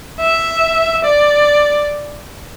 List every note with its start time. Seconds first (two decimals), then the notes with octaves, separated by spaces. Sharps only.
0.20 E5
1.05 D5